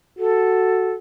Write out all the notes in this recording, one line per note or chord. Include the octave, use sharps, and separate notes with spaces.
F#4 A4